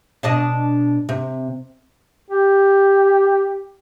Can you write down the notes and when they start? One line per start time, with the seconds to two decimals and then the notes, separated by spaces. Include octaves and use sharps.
0.23 B2 D4 D#5
1.09 C3
2.30 G4